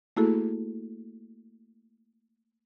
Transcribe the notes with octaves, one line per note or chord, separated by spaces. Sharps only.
A3 A#3 E4 F#4 G#4 A4